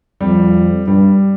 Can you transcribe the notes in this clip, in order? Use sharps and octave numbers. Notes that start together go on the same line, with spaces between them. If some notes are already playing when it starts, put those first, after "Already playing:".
F2 G3
G2 G3